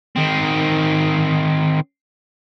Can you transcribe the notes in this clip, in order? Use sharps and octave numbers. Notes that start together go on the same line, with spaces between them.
D#3 C4